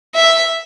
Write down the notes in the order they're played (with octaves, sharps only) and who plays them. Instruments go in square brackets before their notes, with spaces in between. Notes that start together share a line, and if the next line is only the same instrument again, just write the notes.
[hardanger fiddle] E5